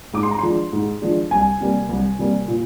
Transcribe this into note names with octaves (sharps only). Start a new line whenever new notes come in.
G#2 D6
C6
A#5
F3 G#3 D4 C6
G#2
F3 G#3 D4
C2 G#5
C3 G3 A#3
C2
C3 G3 A#3
A#2